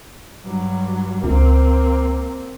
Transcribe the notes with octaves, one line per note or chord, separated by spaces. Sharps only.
G2 F#3
C#2 A#3 C4